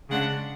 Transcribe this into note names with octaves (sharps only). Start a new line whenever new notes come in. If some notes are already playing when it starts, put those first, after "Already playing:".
C#3 G#3 D4 F#5